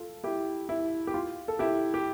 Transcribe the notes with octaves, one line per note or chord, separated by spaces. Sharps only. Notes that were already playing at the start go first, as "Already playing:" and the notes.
Already playing: F4 A4
E4 G4
E4
G4
F4
A4
E4 G4
G4